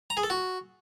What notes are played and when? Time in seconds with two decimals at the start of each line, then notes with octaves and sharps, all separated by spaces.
0.10 A#5
0.17 G#4
0.23 A4
0.30 F#4